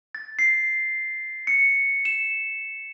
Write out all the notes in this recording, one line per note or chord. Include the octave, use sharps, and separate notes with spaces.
A6
C7
C#7
E7